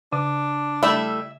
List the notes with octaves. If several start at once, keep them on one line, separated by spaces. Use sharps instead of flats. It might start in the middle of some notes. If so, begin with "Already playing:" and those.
C#3 D4
G3 A3 E4 E5